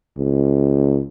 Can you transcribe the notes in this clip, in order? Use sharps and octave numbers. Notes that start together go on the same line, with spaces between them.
C#2